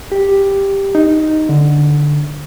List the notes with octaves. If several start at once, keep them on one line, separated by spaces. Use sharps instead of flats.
G4
D#4
D3